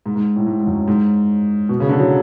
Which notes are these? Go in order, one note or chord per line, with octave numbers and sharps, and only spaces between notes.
G#2
G#2
A2
G#2
G#2
F#2
G#2
B2
C#3
D3
F#3